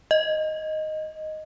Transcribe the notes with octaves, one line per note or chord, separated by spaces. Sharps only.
D#5